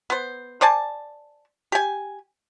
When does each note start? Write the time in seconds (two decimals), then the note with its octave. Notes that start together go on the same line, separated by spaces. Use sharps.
0.10 B3 C5
0.61 C5 D5 G#5 A5
1.72 G4 G#5